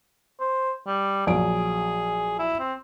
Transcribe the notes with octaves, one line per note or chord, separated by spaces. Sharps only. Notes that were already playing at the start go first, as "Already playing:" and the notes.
C5
G3
A#1 F#3 G#4 D7
E4
C4